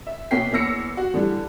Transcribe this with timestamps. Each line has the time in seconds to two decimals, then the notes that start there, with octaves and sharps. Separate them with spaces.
0.07 E5
0.31 B2 A#3 C#4 G5 B6 C7
0.52 E2 A#3 C#5 E6 A#6 C#7
0.97 F#4
1.14 D3 E3 G3